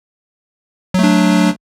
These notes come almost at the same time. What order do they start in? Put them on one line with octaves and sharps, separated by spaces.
F#3 A3 D4